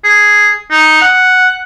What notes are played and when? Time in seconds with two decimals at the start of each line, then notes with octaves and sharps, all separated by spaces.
0.04 G#4
0.71 D#4
1.01 F#5